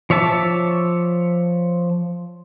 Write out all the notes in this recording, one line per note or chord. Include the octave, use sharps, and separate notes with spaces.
F3 C#5 E5 A5 D6